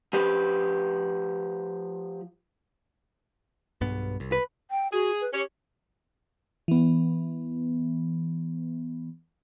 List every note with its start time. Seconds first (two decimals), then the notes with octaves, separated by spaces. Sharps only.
0.13 F3 G4 B4
3.81 B1 G2 B3
4.20 C2
4.32 B4
4.71 G5
4.93 F#4 G#4
5.21 B4
5.34 C#4 G4 C#5
6.68 E3 B3